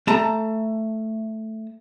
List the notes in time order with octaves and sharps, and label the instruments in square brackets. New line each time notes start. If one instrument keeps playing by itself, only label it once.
[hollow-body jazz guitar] A3 A5 A#5